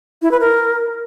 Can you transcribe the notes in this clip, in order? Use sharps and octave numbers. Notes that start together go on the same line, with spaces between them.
E4
B4
A#4